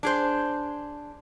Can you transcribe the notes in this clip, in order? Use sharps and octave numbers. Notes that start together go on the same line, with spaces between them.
D4 G#4 C5